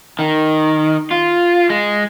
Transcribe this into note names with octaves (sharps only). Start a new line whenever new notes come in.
D#3
F4
G#3